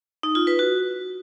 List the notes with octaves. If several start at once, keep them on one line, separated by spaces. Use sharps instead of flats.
D#4
F4
B4
F#4